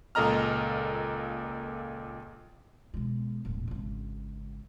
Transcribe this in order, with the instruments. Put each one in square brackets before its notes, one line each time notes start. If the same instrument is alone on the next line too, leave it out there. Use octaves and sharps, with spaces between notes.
[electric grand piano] C#2 A#2 A4 D#5 A#5 F6
[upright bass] B2 G#3
D#1 A2
G#1 C#3